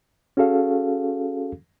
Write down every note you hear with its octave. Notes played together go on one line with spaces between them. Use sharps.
C#4 F#4 G#4 A4 F5